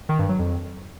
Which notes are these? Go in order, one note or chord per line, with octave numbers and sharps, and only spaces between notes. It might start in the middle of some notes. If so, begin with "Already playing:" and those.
D#3
G2
F#3
F2